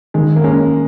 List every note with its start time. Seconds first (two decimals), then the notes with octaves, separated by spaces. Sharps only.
0.14 D#3 G#3
0.36 A#3
0.44 G#3 C#4